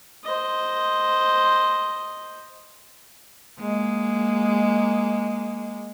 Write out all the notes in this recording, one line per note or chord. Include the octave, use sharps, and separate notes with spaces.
C5 D#5
G#3 A#3